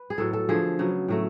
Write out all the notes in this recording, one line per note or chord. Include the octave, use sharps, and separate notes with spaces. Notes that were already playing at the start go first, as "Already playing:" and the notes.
Already playing: B4
G#4
A2 F#3 B3 A4
A4
D3 F3 A3 G#4
C#3 F#3 B3
A2 F#3 A3